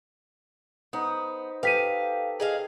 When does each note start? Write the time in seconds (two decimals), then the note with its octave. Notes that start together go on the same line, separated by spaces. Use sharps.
0.93 B3 D#4 C5
1.63 G4 A4 B4 F5 G5 B6 D#7
2.40 G#4 D#5 F5